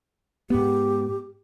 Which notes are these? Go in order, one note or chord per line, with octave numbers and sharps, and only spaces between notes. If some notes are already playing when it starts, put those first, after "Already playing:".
G#2 B3 G4